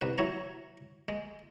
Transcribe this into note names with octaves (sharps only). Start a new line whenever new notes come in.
C2 B4
F#3 E4 C#5 A#5
G#3